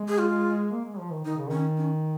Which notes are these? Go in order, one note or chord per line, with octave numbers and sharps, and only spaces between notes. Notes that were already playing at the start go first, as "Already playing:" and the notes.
Already playing: G#3
G#4
F4
A#3
G#3
F3
D#3
D#3 D#4
C#3
D#3 C#4
C#4